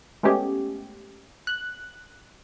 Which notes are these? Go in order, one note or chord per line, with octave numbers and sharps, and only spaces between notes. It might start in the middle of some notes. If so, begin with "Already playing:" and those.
G#3 A3 B3 C#4 G4 G#4
F#6